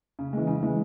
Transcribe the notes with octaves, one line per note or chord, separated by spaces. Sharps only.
C#3
E3 G#3
C#3
E3 G#3